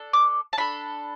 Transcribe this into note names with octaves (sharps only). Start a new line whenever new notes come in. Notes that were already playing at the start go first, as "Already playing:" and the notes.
Already playing: D4 A4
D6
A5
D4 A4 B5